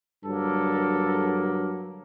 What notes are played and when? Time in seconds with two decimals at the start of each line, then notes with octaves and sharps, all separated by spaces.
0.24 G2 D3 F#3 A#3 A4